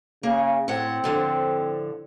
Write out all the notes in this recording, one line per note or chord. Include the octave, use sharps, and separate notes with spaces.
C#3 A#3
A2 C4 F#5
A2 D3 F3